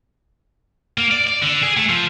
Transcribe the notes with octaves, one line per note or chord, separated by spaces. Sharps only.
A#3
D5
D5
D3
G#4
A3
F3